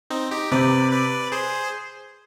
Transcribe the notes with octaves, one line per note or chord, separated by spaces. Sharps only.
C4 D#4
D#4 G4
C3 B4 D5
B4 D5
G#4 C5